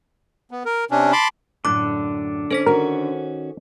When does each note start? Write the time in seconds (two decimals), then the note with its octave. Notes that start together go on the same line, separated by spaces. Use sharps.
0.51 B3
0.65 A#4
0.91 C3 C#4 D4
1.12 A5 B5 C6 D6
1.65 F#2 A2 D3 D4 D6 F#6
2.51 C#4 A4 C5 B6
2.66 D#3 C#4 F#4 A#4